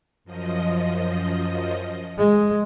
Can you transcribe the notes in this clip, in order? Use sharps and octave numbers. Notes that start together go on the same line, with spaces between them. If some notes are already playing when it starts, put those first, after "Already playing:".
F#2 F3 D#5
G#3